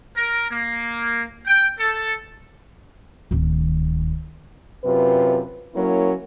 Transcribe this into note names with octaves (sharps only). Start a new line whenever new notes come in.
A#4
A#3
G5
A4
D1 D#3
F#2 C3 F4 B4
F#3 A#3 C#4 E4 A#4